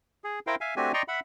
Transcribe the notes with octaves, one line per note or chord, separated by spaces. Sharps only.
G#4
E4 A#4 C5 F5 G5
E5 F5 G#5
A3 C4 D4 F#4 G4 G#5
D5 D#5 G5 A#5 C6 C#6
E5 F#5 B5